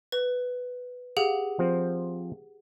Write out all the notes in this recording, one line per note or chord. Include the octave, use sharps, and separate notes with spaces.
B4
G4 G#4 F5 F#5
F3 C4